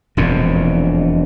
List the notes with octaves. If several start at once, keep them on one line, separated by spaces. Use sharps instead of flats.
E1 F2 A#2